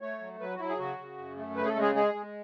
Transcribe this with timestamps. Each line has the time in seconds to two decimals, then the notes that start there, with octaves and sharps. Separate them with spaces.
0.01 A3 C#5
0.20 F#3
0.40 F#3 B4
0.56 F#4
0.59 F#3 E4
0.69 G#4
0.79 C#3 F#4
0.98 C#3
1.18 F#2
1.37 A3
1.56 C#3 B4
1.65 G#4
1.69 A4
1.76 G#3
1.82 G#4
1.95 G#3 G#4
2.14 G#3